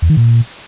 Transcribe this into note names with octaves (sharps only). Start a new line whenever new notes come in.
E2
D#3
A#2